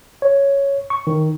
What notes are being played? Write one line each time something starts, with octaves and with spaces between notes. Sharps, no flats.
C#5
C#6
D#3